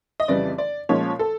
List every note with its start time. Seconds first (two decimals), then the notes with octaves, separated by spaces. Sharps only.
0.20 D#5
0.28 F2 C#3 E3 G3 D5
0.58 D5
0.89 A#2 F3 G#3 C#4 C#5
1.19 A4